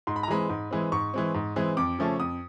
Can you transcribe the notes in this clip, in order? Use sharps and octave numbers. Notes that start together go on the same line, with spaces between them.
G#2 C6
B5
A#5
E3 G#3 C4 B5
G#2
E3 G#3 C4
G#2 C#6
E3 G#3 C4
G#2
E3 G#3 C4
F2 D6
C#3 F3 A3 C#4
F2 D#6